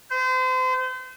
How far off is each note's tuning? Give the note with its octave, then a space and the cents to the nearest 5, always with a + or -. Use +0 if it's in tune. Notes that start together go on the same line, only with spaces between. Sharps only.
C5 -35